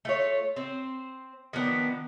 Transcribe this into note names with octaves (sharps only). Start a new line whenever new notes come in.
A3 F4 C#5
C4 C5
D#3 F3 B3 D4